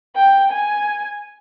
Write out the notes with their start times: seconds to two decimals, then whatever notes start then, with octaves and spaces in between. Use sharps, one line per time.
0.16 G5
0.51 G#5